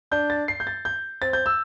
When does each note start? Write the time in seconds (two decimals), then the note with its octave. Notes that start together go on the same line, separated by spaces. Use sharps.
0.12 D4 G6
0.30 A6
0.48 C7
0.60 G6
0.67 A6
0.85 G6
1.22 C4 A6
1.33 G6
1.46 E6